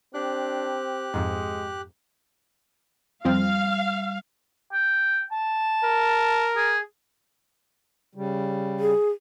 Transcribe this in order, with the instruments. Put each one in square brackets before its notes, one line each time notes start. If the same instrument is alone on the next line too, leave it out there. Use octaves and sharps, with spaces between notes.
[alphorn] C4 [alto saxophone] D4 [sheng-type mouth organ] G4 F#6
[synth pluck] F2 G#2 [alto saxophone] G#3
[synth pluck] F2 F3 C4 [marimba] G3 [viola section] F5
[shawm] G5
A5
[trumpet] A#4
[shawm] G#4
[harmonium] C#3 G3
[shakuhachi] G#4